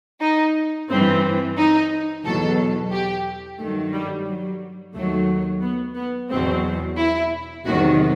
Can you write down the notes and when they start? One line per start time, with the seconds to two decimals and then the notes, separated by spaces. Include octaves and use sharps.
0.21 D#4
0.89 G2 E3 C4
1.57 D#4
2.24 E2 B2 F#3 A4
2.92 G4
3.60 G2 D#3 F#3 A3
3.93 G3
4.27 F#3
4.95 D#2 D#3 F#3 A3
5.62 B3
5.96 B3
6.30 E2 B2 F#3 C4
6.98 E4
7.65 E2 C3 D#3 F#3 F#4